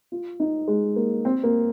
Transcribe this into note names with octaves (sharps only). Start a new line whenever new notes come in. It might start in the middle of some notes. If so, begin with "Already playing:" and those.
F4
D#4
G#3
A#3
C4
A#3